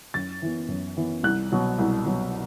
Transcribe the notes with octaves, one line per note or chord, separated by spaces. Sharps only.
F#2 A6
E3 B3
F#2
E3 B3
C2 F#6
B2 F#3
C2
B2 F#3